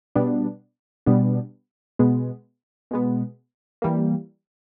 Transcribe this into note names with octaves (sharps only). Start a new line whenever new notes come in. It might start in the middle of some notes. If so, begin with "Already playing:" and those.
B2 G3 B3 D4
B2 G3 B3 D4
B2 G#3 B3
B2 G#3 B3
E3 G3 A#3